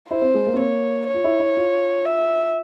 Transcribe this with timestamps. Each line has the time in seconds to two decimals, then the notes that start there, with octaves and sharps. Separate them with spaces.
0.10 E4 C5
0.22 C4
0.34 G#3
0.47 A#3
0.54 C4
0.59 A#3 C#5
1.07 C#5
1.14 F4
1.24 E4
1.40 E4
1.57 F4
2.05 E5